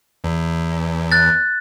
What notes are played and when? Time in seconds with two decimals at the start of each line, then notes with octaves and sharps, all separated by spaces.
0.24 E2
1.12 F#6 A6